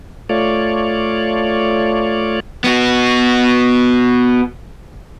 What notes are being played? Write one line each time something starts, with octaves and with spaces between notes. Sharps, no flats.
A3 F4 C#5 D5
B3 F#4